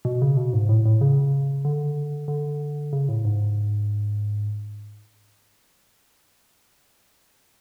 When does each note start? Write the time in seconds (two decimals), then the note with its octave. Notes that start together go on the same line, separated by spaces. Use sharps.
0.05 B2
0.22 C#3
0.37 B2
0.53 G#2
0.69 A2
0.85 A2
1.01 C#3
1.65 D3
2.28 D3
2.93 C#3
3.09 A2
3.25 G#2